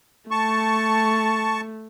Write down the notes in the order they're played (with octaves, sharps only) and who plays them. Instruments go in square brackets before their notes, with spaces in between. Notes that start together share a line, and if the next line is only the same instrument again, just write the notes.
[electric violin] A3 [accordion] A5 C#6